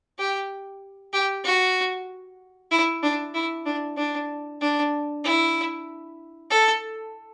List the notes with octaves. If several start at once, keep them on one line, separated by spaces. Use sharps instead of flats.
G4
G4
F#4
E4
D4
E4
D4
D4
D4
E4
A4